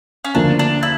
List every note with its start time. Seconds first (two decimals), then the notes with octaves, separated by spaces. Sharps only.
0.24 C#4
0.35 D2 D3 F3 A#3 D4
0.59 D4
0.83 E4